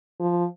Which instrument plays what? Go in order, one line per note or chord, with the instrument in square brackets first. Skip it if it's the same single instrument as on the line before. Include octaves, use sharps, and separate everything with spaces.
[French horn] F3